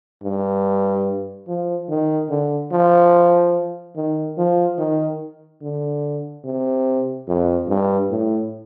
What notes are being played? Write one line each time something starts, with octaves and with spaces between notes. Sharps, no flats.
G2
F3
D#3
D3
F3
D#3
F3
D#3
D3
C3
F2
G2
A2